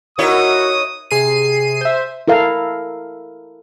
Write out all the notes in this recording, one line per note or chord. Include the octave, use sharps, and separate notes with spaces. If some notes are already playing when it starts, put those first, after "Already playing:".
D#4 E4 F#4 A#4 C#5 D#6
C3 G#4 C7 D#7
C5 E5
E4 A4 A#4 F5